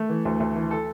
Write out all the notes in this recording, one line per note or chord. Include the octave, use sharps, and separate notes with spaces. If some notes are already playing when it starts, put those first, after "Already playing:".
Already playing: A3
E3
D2
D2
E3
A4